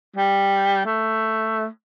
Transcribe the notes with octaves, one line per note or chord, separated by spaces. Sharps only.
G3
A3